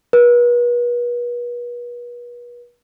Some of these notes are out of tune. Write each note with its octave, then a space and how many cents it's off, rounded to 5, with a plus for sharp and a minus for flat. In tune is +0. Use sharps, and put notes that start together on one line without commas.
B4 -40